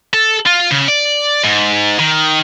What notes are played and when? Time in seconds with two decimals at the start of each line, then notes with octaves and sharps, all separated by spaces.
0.14 A4
0.46 F4
0.71 C#3
0.88 D5
1.44 G#2
1.99 D#3